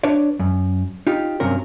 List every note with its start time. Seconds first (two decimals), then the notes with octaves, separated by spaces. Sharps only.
0.03 D4 B4 C#5 D5
0.39 F#2
1.07 D#4 F4 G4
1.40 G2 C3 F#3 C#4 A#4